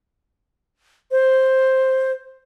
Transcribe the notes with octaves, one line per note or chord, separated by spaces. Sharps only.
C5